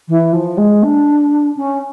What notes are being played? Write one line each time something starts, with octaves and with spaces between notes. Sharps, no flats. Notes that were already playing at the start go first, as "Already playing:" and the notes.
E3
F3
G#3
D4
C#4